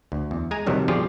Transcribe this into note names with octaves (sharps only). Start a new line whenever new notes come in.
D2
E2
G#3 G#5 A#5
F2 C3 D#3 F#3 G3
B2 F3 G3 F4 G4 G#4